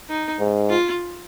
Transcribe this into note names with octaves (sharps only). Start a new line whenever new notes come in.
D#4
G#2
F4